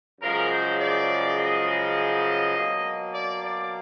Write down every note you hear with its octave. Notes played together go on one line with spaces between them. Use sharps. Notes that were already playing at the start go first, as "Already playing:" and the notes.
F#2 C#3 F3 G#3 A#4
C5
D5
D#5
B2 F#3 A#3
D5
D5